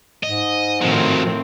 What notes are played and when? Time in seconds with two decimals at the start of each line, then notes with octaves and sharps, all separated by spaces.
0.23 G#2 D#5
0.82 A2 D#3 F3 F#3 C4